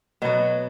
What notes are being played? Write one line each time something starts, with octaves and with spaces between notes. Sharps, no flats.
B2 F#3 B3 F#4